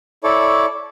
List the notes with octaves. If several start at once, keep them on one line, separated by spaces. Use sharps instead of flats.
E4 A4 C#5 D5